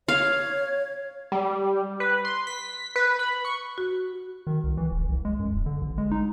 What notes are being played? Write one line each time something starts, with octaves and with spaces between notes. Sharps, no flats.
C#5 F5
G3
B4
C6
B6
B4
B5
C#6
F#4
D#3
C2
E3
D#1
C2
G#3
F#2
D1
D3
A1
G#3
D#4